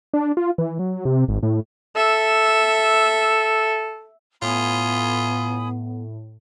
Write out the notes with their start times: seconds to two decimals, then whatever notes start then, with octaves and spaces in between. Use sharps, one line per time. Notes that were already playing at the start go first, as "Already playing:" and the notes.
0.14 D4
0.37 F4
0.58 E3
0.79 F#3
1.05 C3
1.28 G#1
1.43 A2
1.96 A4 E5
4.42 A2 B3 F4 G#5 B5 D#6